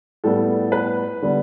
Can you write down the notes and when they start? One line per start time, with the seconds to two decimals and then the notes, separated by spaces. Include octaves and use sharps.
0.24 A2 G3 B3 A4
0.72 B4
1.22 D3 G3 B3